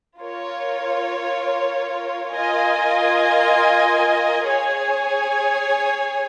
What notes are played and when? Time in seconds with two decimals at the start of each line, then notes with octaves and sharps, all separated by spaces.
0.20 F4 A#4 C#5
2.34 F4 A#4 D#5 G#5
4.46 G#4 C#5 G#5